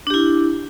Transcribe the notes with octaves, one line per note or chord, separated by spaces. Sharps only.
D4 E4 G4